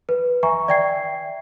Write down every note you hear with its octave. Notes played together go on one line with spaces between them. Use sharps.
B4
E5 G#5 A#5 C#6
D5 E5 G5 G#6 C7